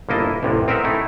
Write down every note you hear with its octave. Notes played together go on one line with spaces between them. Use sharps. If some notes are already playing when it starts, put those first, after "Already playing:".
G1 A#3 E4 D#5 A5
A1 E2 C3
C4 A#4 D#5 E5 F#5
A3 D#4 E4